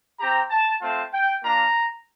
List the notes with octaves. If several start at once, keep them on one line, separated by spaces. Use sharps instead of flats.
C4 G4 A#5
A5
A3 C4 F4 A5
G5
A#3 D4 F4 A#5